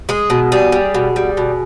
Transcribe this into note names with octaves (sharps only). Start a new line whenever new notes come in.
G#3 G#4
B2
G3 G#4
G3
B2
G3
B2